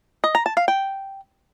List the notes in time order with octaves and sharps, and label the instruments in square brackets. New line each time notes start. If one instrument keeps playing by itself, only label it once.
[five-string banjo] D#5
A#5
A5
F5
G5